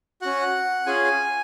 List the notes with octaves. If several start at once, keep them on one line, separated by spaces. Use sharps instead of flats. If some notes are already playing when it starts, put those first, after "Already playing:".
C#4 F#4 F#5
C#4 F4 G#4 G#5